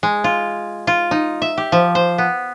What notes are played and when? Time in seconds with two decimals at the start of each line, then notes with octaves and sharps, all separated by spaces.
0.03 G#3
0.24 F4
0.87 F4
1.11 D#4
1.42 E5
1.57 G4
1.72 F3
1.95 C5
2.18 B3